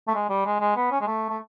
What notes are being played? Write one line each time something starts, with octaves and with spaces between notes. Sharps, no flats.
A3
G#3
G3
G#3
G#3
B3
C#4
G#3
A3
A3